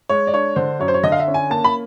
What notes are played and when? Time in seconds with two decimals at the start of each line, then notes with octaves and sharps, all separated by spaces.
0.09 G#3 C#5
0.27 D5
0.34 D4 C#5
0.56 D3 C5
0.80 F#2 C#5
0.88 C5
0.94 C#5
1.03 D3 D#5
1.12 F5
1.20 E5
1.28 C#4
1.34 G#5
1.50 A#3 A5
1.64 B5